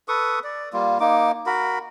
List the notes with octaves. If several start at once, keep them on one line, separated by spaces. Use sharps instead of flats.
A4 B4 C#6 D#6
D5
G3 A#3 F4
A#3 D#4 D6
F#4 A#4 B5